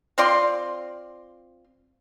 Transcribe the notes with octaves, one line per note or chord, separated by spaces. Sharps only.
C4 F4 D5 C6